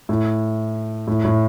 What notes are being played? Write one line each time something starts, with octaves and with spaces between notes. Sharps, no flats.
A2
A2
A2